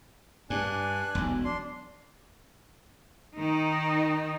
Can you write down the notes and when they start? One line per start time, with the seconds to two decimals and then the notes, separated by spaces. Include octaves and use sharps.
0.50 G2 D4 G#5 F#6
1.15 E1 B1
1.44 D4 C6
3.36 D#3 D#4